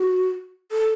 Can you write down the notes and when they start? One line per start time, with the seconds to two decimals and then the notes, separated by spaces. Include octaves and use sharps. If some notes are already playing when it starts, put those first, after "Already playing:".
Already playing: F#4
0.72 A4